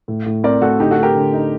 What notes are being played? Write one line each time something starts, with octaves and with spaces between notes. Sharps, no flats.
A2
A2
C4 A#4 D5
A2 F#4 A4
D3 D#4 G4
F#4 A4
A3
G4 A#4
D3
D#4